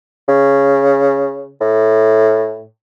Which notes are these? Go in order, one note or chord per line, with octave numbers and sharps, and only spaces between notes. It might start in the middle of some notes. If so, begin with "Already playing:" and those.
C#3
A2